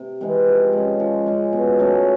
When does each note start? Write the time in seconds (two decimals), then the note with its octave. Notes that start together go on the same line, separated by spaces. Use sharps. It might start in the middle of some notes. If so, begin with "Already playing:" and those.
Already playing: C3
0.21 E3 G#3 C4
0.46 F3
0.73 G#3 C#4
1.00 F3
1.26 G#3 C#4
1.53 B2
1.79 F#3 A3 C#4